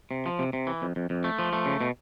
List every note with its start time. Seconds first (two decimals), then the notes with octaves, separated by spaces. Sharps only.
0.11 C3
0.26 F3
0.39 C3
0.53 C3
0.67 E3
0.82 F2
0.96 F2
1.10 F2
1.24 A3
1.39 F3
1.53 A3
1.66 C#3
1.81 B2